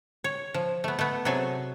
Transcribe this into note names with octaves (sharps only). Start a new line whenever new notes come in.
C#5
F3
A3 B3
A3 B3
C3 F#3 G#4 A4 G#5